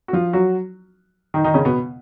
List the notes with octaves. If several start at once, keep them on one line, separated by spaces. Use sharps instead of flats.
F#4
F3 F4
F#3 F#4
D#3 D#4
D#3 D#4
C#3 C#4
B2 B3